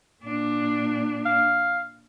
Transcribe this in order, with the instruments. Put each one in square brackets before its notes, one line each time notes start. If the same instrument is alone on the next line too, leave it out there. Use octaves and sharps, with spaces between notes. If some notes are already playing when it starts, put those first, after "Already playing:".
[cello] A#2 D4
[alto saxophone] F5